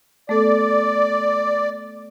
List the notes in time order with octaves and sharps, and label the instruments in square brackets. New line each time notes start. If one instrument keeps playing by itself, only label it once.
[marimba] A3 B3 A4 [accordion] D5